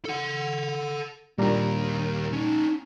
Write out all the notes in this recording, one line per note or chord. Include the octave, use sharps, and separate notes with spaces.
A4 F#5
D#2 A#2 G3 D4 A#4 A#5
C#4 D#4 E4